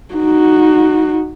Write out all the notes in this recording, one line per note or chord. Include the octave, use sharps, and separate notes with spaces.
D#4 F#4